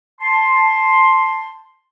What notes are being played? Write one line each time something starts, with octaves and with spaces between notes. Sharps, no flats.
A5 C6